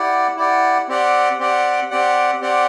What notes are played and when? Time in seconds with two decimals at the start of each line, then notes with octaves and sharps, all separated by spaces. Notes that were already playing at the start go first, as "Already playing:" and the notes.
Already playing: E4 G4 D5 F#5
0.37 E4 G4 D5 F#5
0.88 C4 G4 D5 F#5
1.39 C4 G4 D5 F#5
1.90 C4 G4 D5 F#5
2.41 C4 G4 D5 F#5